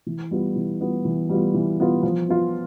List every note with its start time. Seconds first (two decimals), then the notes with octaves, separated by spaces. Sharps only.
0.06 E3
0.31 G3 B3 F4
0.55 E3
0.80 G3 B3 F4
1.05 E3
1.29 G3 B3 F4
1.54 E3
1.79 G3 B3 F4
2.03 F3
2.28 B3 F4